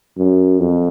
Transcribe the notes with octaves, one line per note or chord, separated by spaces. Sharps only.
F#2
F2